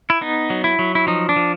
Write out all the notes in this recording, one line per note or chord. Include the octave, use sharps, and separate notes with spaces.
E4
B3 D#4
F#3
E4
F#3
E4
F3 D#4
D4
F3